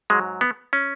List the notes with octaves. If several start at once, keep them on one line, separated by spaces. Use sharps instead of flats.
G#2 F#3 G#3
B3
C#4